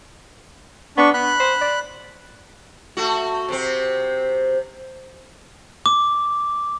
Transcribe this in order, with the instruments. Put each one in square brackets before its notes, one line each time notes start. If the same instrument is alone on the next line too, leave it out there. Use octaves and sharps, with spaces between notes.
[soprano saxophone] B3 [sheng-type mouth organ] D4 C#6
[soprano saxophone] B3 [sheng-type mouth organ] B5 F#6
[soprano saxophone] C5
D5
[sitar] A3 F#4
C3 C4
[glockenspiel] D6